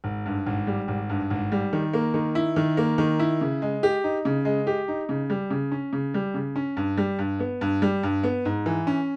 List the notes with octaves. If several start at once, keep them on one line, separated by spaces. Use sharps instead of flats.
G#1
G2
G#1
G3
G#1
G2
G#1
G3
D#3
A#3
D#3
E4
D#3
A#3
D#3
E4
C#3
G#3
G4
D#4
C#3
G#3
G4
D#4
C#3
G3
C#3
C#4
C#3
G3
C#3
C#4
G2
G3
G2
B3
G2
G3
G2
B3
G#2
E3
C#4